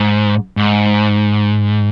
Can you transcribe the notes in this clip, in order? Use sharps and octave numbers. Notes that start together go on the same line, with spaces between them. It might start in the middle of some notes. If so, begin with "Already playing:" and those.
Already playing: G#2
G#2